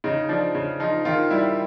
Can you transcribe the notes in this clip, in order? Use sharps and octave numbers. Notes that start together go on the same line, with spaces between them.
C#3 D#4
F3 D4
C#3
F3 D#4
D#3 F4
G3 E4